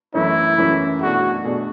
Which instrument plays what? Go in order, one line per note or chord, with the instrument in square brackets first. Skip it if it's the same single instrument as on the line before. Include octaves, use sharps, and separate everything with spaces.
[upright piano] F#2 E3 A3 C#4 [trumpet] E4
[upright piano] F#2 E3 A3 C#4
[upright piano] B2 A3 D4 G#4 [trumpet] F#4
[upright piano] B2 A3 D4 G#4